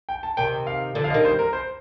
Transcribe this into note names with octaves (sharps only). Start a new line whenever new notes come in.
G5
A5
C3 D#3 G5
F5
D3 F3
F5
D#5
D#3 G3
C5
A#4
C5